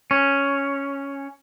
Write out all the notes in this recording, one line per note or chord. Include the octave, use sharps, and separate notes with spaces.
C#4